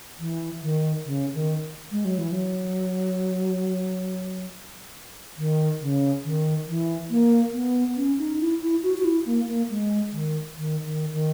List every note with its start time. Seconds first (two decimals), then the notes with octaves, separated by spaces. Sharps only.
0.19 E3
0.62 D#3
1.06 C#3
1.34 D#3
1.91 G#3
2.05 F#3
2.18 E3
2.31 F#3
5.37 D#3
5.81 C#3
6.24 D#3
6.67 E3
7.10 A#3
7.53 B3
7.97 C#4
8.18 D#4
8.40 E4
8.61 E4
8.83 F#4
8.98 F#4
9.04 E4
9.26 A#3
9.48 A#3
9.70 G#3
10.12 D#3
10.56 D#3
10.85 D#3
11.13 D#3